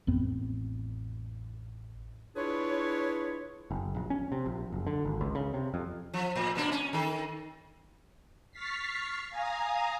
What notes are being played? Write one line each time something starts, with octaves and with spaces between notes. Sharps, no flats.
A1 F2 B3 C4
D4 E4 F4 G#4 B4 C#5
F#1
A#1
C#4
C3
A#1
F#1
D3
G#1
C#2
C#3
C3
F2
F3
A2
B2 A#3 D4
C#4
D#3 A4
C#6 F6 A6 B6 C7
F5 G#5 A#5 D#6